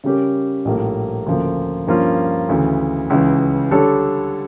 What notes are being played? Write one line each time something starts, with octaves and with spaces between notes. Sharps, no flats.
C#3 G3 C#4 G4 A#4
A#1 A2 G3 A#3
D2 C#3 F3 A#3
G2 F3 A#3 C#4 F4
D2 C#3 E3
C#2 C#3 E3
D3 G3 D4 A4 C#5